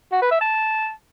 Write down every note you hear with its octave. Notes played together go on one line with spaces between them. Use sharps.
F#4
B4
E5
A5